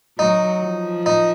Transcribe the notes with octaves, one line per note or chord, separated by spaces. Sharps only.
F#3 D#4
F3
D#4